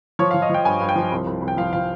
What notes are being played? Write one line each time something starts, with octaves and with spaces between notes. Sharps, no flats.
F3 C#5
F5
F3
D#5
F3 G5
G2 G#5
G2
G5
F3
C2
C2
C2
G5
F3 F5
F3 F5